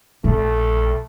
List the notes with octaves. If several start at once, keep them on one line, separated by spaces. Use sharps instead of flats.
A#1 A3